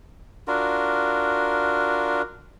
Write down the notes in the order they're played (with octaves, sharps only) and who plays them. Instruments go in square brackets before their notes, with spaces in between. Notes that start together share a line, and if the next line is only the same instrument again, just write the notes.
[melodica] D4 F4 F#4 A#4